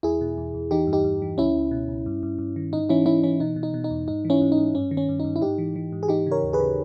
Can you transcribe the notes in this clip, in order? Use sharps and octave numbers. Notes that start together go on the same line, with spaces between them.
E2 E4 G#4
B2
E2
E2
E3 D#4 G4
G2
D#4 G4
G2
E3
C#2 C#4 E4
C#2
B2
C#2
G2
G2
G2
D#3
G#2 D#4
E3 C#4 E4
E3 C#4 E4
E3 C#4
B2 D#4
B2
D#4
B2
D#4
E2
G#2 D#4
E3
C#4 E4
G#2
D#4
G#2
G2 C#4
D#3
C#4
G2
G2 D#4
E4
G#2 D#4 G4
E3
E3
G#2
G#4
E3 D#4 G4
C#3
A#4 C#5
D#2
G#4 B4
C#3